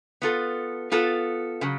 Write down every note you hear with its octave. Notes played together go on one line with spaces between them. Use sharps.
B3 F4 A4
B3 F4 A4
C#3 F#3